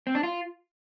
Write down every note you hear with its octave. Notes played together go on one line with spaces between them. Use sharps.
C4
D4
F4